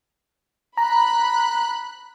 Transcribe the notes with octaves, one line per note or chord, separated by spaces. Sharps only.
A#5 B5 F#6